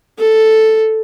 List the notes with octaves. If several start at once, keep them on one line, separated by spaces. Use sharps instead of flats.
A4